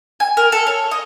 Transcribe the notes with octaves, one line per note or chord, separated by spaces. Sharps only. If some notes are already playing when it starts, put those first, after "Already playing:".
G#5
A#4
A4
C#5
D#5